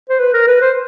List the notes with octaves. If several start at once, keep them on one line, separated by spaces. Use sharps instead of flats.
C5
B4
A#4
B4
C5